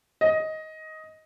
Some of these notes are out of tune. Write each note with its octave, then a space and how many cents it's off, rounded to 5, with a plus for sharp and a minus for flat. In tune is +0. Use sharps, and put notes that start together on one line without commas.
D#5 +10